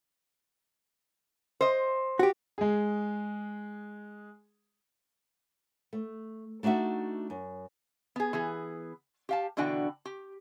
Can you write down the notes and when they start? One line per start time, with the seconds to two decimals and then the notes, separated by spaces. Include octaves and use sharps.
1.61 C5 D#5
2.19 F#4 G4
2.58 G#3 G#4
5.93 A3
6.63 A3 D4 D#4 F#4 E5
7.30 F#2
8.16 B3 G#4
8.33 E3 B3 G#4
9.29 G4 F5 A5
9.57 B2 D3 E3 D4 F#4 G5
10.05 G4